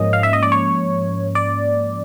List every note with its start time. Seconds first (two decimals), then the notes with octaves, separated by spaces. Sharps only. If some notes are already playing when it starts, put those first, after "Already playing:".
Already playing: G#2 F3 A#3 C#4 D#5
0.13 F5
0.23 E5
0.33 D#5
0.43 D5
0.52 C#5
1.35 D5